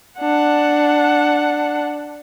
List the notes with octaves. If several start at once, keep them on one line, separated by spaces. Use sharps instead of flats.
D4 F#5